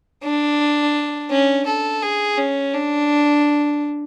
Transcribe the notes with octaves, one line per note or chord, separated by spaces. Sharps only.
D4
C#4
A4
G#4
C#4
D4